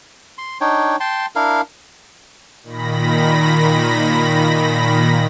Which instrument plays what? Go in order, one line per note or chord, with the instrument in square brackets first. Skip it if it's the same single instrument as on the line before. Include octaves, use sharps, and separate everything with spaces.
[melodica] C6
D4 D#4 C#5 G5
G5 A5 C6
D4 E4 A#4 F5
[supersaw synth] A#2 D#3 B5 A#6